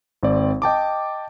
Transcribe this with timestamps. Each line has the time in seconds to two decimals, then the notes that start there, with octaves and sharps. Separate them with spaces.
0.23 G#1 C4 D5
0.62 D#5 G5 A5 D6